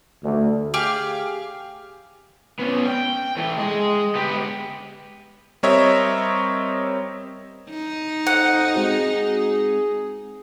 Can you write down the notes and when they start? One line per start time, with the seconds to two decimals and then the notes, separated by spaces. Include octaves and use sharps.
0.23 D2
0.74 G4 G#4 F5
2.59 B3 C#4
2.86 G5
3.37 E3 A3
3.58 G#3 D#5
4.15 B3 G4
5.63 G3 C4 A#4 C#5 D#5 E5
7.70 D#4
8.27 F2 F#5
8.75 G#3 C4 F#4 G#4